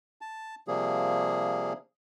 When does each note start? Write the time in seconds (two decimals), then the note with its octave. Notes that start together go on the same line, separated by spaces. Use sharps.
0.21 A5
0.68 C3 F3 G3 A#3 G#4